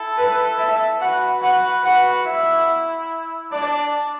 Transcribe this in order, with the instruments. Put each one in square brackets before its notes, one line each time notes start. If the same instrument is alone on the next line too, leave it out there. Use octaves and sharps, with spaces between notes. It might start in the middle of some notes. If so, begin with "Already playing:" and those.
Already playing: [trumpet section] E4 A4
[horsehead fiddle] B4
E5
[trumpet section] F#4 B4 [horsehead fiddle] F#5
[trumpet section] F#4 B4 [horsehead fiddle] F#5
[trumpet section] F#4 B4 [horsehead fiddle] F#5
[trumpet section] E4 [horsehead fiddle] E5
[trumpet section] D4 [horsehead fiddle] D5